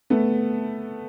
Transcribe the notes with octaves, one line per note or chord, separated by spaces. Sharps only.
A3 B3